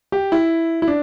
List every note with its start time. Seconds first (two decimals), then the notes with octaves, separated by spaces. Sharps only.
0.12 G4
0.32 E4
0.82 E4
0.88 D4